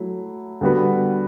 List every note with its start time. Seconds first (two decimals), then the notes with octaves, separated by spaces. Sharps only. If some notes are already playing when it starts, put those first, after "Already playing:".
Already playing: F#3 A3 E4
0.61 D3 G3 B3 F#4 B4